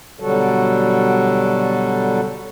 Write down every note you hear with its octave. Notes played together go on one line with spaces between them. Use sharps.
B2 D3 F#3 G3 F#4 A4